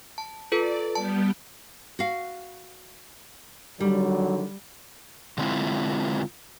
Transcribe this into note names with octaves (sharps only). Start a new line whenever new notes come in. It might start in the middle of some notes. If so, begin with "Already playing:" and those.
A5
F4 A4 B4 D5
G3 B3 G4 A5
F#4 F5
D3 D#3 F#3 G3
D3 F#3 G#3 C4 E4 F4